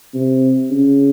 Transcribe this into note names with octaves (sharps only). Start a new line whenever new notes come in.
C3
C#3